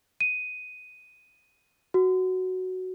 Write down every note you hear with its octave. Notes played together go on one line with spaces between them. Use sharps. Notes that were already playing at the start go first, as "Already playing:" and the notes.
D#7
F#4